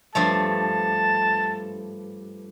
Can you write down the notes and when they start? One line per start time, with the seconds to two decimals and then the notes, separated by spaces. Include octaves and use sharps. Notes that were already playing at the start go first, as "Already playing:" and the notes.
0.15 G2 F3 A3 A5